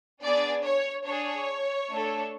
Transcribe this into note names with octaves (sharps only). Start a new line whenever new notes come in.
B3 D4 G#4 D5
C#5
D4 G#4 C#5
A3 D4 A4